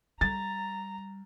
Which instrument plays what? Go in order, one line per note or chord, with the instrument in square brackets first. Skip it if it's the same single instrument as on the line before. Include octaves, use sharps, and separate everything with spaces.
[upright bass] G3 [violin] A#5 [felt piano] A6